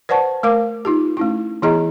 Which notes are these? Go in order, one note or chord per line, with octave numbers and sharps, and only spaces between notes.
B4 C5 D5 F#5 A5 C#6
A3 A#4 F5 D6
D#4 F4 G4
A3 C#4 E4
E3 B3 E4 G#4 D#5 A#5